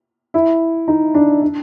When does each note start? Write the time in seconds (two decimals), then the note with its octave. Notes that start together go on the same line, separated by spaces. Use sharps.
0.34 E4
0.88 D#4
1.14 D4
1.42 D4